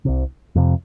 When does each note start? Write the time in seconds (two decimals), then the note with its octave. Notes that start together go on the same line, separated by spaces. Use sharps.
0.05 C2 C3
0.56 F2 C3